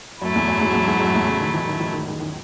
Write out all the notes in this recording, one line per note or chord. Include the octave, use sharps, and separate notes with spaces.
F#2 A2 F#3 A3 E4
E2
F#2
G#2
E2
G#2
F#2
E2
C#3
D#3
E3
D#3
E3
D#3
D#3
D#3